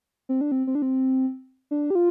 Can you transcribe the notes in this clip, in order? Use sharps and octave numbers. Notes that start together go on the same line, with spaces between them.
C4
D4
C4
C4
D4
C4
D4
G4
F4